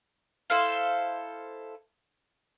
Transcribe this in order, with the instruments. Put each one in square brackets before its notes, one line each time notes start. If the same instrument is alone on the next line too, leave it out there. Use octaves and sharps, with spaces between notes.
[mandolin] E4 A4 C5 F5